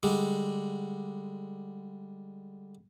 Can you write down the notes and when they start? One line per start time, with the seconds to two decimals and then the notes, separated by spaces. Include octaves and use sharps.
0.03 D3 G3 G#3